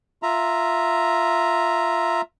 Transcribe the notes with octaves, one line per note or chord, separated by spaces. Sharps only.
F4 E5 A#5